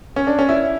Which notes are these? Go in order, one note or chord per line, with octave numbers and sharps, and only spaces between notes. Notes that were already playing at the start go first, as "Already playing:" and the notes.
C#4
D4
C#4
E4